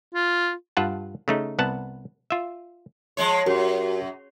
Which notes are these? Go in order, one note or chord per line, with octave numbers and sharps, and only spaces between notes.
F4
G2 F4 F#5 A5
C#3 A3 D#4
C2 B3 F#5 A5
F4 E5
F3 G#3 C#5
F#2 F#4 G4 A#4